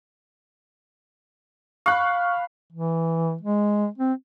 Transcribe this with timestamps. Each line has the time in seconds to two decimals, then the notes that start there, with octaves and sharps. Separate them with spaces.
1.86 F5 B5 C#6 F#6
2.72 E3
3.41 G#3
3.98 C4